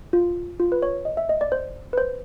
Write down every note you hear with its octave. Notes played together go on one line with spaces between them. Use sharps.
F4
F4
B4
C#5
D#5
E5
D#5
D5
C5
B4
C5